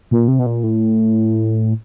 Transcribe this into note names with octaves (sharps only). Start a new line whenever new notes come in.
A#2
C3
B2
A#2
A2